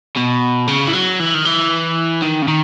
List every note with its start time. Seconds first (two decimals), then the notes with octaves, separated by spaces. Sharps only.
0.17 B2
0.68 C#3
0.87 E3
0.93 F#3
1.19 E3
1.34 D#3
1.45 E3
2.22 D#3
2.42 C#3
2.48 D#3